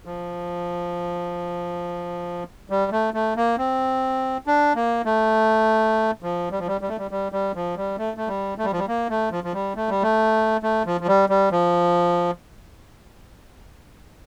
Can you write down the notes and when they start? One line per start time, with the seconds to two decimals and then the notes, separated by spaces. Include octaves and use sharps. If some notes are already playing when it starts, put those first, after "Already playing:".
0.05 F3
2.70 G3
2.92 A3
3.14 A3
3.36 A#3
3.58 C4
4.47 D4
4.75 A#3
5.05 A3
6.22 F3
6.51 G3
6.59 F3
6.67 G3
6.81 G3
6.89 A3
6.98 G3
7.11 G3
7.32 G3
7.55 F3
7.77 G3
7.98 A3
8.17 A3
8.28 G3
8.58 A3
8.64 G3
8.72 F3
8.79 G3
8.88 A#3
9.09 A3
9.32 F3
9.44 F3
9.53 G3
9.76 A3
9.89 G3
10.03 A3
10.63 A3
10.86 F3
11.01 F3
11.08 G3
11.29 G3
11.52 F3